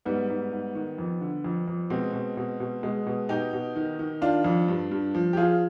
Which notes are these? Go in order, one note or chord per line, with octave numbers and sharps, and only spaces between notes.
G#2 G3 B3
G#2
G#2
D#3
F2
D3
F2
F2
B2 G#3 C4
B2
B2
B2
B2 G#3
B2
B2 D#4 G4
B2
D#3
D#3
D#3 D4 F4
F2
G2
G2
F3
G4
F3 F4 G#4